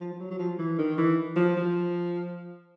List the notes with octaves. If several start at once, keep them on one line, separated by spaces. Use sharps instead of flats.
F3
F3
F#3
F#3
F3
E3
D#3
E3
F3
F3